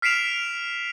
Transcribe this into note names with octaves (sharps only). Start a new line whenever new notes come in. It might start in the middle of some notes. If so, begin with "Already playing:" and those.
F6 B6 C7 D7 E7 F7